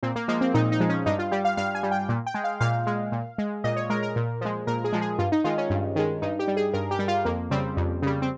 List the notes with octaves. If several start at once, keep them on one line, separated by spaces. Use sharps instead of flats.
A#2 C4
A#3
F3 G#3 A#3
C4
A#2 D#4
D#4
F3 G#3
C#4
G2 D#4
F4
G3 G4
F5
G2 F5
G#5
G3
G5
A#2
G5
G#3
F5
A#2 F5
G#3
A#2
G#3
A#2 D#5
C#5
G#3 A#4
A#4
A#2
F3 G#3
A#2 A#4
G#4
F3 G#3
G#4
G2 F4
D#4
D#3 G#3 F4
C#4
G2
D#3 G#3
G2 D#4
G4
G3
G#4
G2 A#4
G4
G3
F4
F2 A#3
C#3 G3 C4
F2
C#3 G3
C4